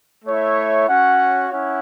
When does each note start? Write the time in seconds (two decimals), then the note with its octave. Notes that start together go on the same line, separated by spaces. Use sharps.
0.25 A3 E4 C#5 E5
0.88 C#4 F#4 C#5 F#5
1.51 C#4 E4 C#5 F#5